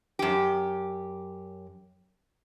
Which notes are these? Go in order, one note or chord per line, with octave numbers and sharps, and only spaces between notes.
F#2 G4